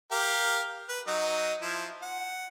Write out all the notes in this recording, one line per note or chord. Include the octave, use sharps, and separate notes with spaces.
G4 A#4 F5
B4
F#3 D#4 D#5
F3 E4
F#5